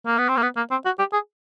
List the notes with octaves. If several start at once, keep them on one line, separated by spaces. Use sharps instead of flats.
A#3
B3
C4
A#3
B3
A#3
C4
F#4
G4
G#4